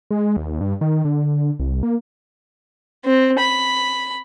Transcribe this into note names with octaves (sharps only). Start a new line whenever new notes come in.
G#3
D#2
G2
D#3
D3
C2
A#3
C4
B5